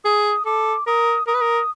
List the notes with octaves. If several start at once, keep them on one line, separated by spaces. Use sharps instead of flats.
G#4 D#6
A4 D6
A#4 D#6
A#4 D#6
B4
A#4